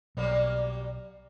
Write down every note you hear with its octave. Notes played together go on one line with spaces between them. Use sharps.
B1 F#3 G3 A#3